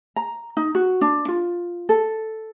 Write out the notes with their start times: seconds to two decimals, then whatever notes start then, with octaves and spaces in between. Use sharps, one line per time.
0.16 A#5
0.57 D#4
0.75 F#4
1.01 D4
1.28 F4
1.89 A4